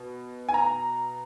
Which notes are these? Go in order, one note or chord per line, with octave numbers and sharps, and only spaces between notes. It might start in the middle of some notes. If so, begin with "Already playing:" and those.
Already playing: B2
G#5
A#5